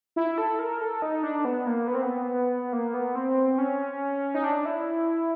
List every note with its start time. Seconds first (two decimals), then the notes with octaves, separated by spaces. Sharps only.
0.16 E4
0.38 A4
0.59 A#4
0.81 A4
1.02 D#4
1.23 D4
1.45 B3
1.66 A#3
1.87 B3
1.95 C4
2.02 B3
2.73 A#3
2.94 B3
3.15 C4
3.58 C#4
4.35 D#4
4.44 D4
4.66 E4